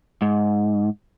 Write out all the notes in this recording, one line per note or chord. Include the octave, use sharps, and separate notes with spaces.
G#2